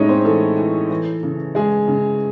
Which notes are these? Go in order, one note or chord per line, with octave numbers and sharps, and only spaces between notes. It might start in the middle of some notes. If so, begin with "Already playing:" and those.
Already playing: A2 G#3 C#4 D#4 E4 C#5 D#5
C4 C5
E3 A3 A4
E3
E3
C#3
G#3 G#4
C#3